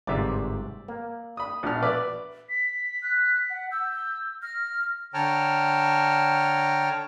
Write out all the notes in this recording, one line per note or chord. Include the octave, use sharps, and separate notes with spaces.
G1 G#2 C3 D5 E5
A#3
B5 D#6
A#1 B2 F6
B4 D5 E5
B6
F#6
F#5
E6 G6
F6 A#6
D3 C#5 G5 A5 A#5 F6